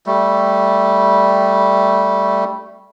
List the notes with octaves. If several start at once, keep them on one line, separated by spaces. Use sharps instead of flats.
G3 A3